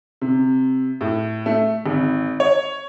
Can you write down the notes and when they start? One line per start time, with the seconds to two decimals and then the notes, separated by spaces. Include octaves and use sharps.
0.22 C3
1.01 A2
1.46 A3
1.86 G#1
2.40 C#5